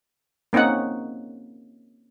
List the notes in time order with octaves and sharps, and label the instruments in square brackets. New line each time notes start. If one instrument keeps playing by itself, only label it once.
[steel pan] A#3 C4 C#4 D#4 F#5